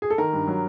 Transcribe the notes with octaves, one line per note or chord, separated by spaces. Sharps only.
G#4
A4
D#3 A#4
G2
F#3